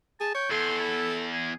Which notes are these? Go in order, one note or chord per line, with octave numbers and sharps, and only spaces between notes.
G#4 A5
C#5 G5
E2 A4 C6
E4
G#4